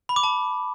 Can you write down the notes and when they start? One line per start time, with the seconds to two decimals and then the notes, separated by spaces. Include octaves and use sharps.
0.09 B5
0.16 D6
0.23 A5